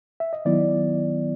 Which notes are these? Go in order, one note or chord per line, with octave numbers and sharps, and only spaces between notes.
E5
D#5
D#3 F#3 B3 E4 D5